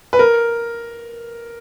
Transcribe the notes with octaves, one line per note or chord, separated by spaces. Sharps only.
B4
A#4